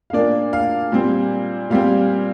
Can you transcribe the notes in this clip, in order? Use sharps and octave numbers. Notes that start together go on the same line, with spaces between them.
F5
A#2 A#3 D4 D5
F5
A#2 G3 C4
A#2 G3 C4 F5